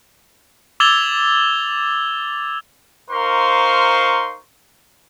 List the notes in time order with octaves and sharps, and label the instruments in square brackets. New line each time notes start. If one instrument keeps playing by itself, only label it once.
[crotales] D6 E6 G#6 A6 F7 G7
[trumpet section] D#4 A#4 C5 F5 C6 C#6